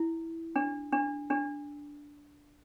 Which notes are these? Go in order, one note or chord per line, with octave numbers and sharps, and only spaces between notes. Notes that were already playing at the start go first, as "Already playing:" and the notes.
Already playing: E4
D4
D4
D4